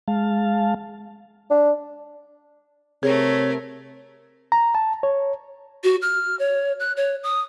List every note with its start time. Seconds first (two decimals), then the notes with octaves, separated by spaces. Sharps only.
0.08 G#3 F5 A5
1.50 D4
3.03 C3 A3 G#4 A#4 C#5
4.52 A#5
4.75 A5
5.03 C#5
5.84 F#4
6.02 F6
6.39 C#5
6.80 F#6
6.97 C#5
7.23 D#6